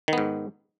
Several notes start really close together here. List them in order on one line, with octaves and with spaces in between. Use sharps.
D#3 B3 G#2